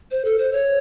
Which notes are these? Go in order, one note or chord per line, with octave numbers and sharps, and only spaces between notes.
C5
A4
C5
C#5